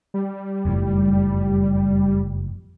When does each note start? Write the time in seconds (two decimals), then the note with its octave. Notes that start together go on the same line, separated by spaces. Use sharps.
0.14 G3
0.65 F#1 F2 A2